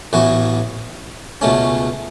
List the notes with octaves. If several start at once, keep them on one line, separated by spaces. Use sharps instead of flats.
A1 A2 E3 B3 F#4
C#2 B2 A3 C#4